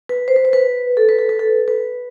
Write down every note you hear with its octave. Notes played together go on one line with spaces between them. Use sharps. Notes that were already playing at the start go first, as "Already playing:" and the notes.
B4
C5
B4
C5
B4
A4
B4
A4
B4
A4
B4